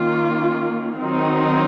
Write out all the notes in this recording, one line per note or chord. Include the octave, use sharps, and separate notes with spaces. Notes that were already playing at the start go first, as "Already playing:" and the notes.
Already playing: D#3 A#3 C#4 F4
D#3 F#3 C4 D#4